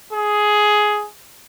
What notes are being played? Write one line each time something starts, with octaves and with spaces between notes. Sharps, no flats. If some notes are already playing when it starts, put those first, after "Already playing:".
G#4